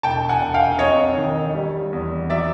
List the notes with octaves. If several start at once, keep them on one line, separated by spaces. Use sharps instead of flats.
E1 G5 A5
F#5 G#5
E1
F5 G5
F2 C#5 D#5
D#3
G3
E2
F#3 D5 E5